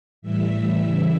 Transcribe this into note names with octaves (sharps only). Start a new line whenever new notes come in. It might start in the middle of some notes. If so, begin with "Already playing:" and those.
A2 E3 G3 E5
C#3 E3 G3